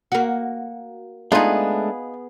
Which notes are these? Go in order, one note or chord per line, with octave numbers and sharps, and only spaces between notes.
A#3 F#4
G#3 A3 B3 D4 D#4 F4 G#4